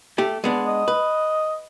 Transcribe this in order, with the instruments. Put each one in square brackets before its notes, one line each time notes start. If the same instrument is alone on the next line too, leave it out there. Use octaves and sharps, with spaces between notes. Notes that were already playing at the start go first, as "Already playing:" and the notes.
[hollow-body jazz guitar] A3 G4
G#3 B3 D4
[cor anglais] D#5
[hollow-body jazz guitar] B4